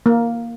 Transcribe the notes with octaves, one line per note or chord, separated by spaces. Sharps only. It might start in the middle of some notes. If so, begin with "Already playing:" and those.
A#3